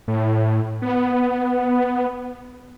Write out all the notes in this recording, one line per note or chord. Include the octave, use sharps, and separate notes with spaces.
A2
B3